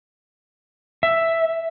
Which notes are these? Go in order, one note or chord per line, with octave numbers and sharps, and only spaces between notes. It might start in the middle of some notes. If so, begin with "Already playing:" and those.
E5